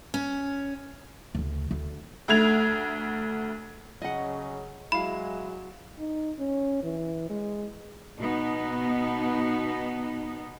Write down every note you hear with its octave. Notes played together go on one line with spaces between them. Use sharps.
C#4
D2 C#3
D2
D2 A3 G#6 F7
C#3 F#3 C#4 D#5 F#5
F#3 G#3 E4 F5 B5
D#4
C#4
E3
G#3
B2 B3 D#4